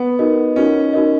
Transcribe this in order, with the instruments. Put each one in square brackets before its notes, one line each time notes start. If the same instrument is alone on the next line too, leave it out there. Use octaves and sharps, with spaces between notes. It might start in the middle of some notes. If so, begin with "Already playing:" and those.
Already playing: [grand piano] B3
[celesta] D#4 F#4 A#4 D#5
[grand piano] C#4 [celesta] D#4 F#4 A#4 D#5
[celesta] D#4 F#4 A#4 D#5